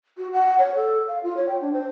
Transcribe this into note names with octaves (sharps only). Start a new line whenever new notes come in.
F#4
F#5
C#5
A4
F5
F4
C#5
G5
D4
C5